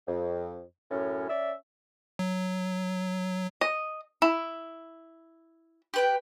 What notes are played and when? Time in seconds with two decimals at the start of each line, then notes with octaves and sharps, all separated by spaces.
0.08 F2
0.91 F#2 A2 C#4
1.29 C#4 D5 E5
2.19 F#3
3.61 D#5
4.22 E4
5.94 G4 B4 G5